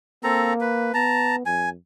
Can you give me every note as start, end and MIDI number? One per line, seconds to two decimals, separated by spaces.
0.24 0.93 58
0.24 0.53 60
0.24 0.53 69
0.24 0.53 82
0.61 0.92 71
0.94 1.44 59
0.94 1.36 81
0.94 1.36 82
1.46 1.76 41
1.46 1.69 80